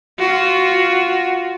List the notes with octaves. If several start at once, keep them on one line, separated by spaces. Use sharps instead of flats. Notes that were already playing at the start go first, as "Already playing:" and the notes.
F4 F#4